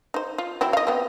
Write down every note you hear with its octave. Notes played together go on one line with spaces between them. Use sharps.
D#4 C5
F4
F#3 C4 E4
D#5 F5
B3 C4